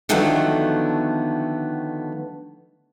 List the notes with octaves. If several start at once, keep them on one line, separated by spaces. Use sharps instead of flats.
D3 D#3 F3 F#3 A3 B3